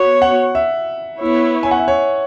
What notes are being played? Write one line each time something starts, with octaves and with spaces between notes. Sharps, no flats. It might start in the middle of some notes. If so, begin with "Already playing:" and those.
Already playing: B3 F#4 C#5
F#5
E5
B3 E4 C#5
G#5
F#5
E5
C#5